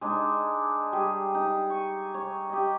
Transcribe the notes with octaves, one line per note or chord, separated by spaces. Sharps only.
G#3 D4 D#4
G3 G#4
D#4
C#6
C#5
G4 D#5